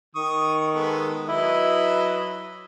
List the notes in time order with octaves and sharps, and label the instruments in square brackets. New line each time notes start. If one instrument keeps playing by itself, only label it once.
[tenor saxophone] D#3 [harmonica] C#6 D#6
[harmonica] G#3 B3 A4
[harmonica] F#3 B4 D#5 [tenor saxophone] E4